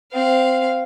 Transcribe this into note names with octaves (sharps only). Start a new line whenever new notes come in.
C4 F5